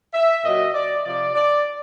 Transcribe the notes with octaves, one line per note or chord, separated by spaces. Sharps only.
E5
A#2 F#3 D#5
D5
C3 F3 D5
D5